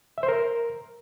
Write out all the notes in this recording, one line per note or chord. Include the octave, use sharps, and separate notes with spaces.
E5
C5
A#4